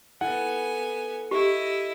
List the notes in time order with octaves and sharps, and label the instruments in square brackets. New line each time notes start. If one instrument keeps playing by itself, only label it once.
[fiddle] B3 G#5 [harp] E4 A4 [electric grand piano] F#5
[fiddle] E4 D#5 [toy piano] G4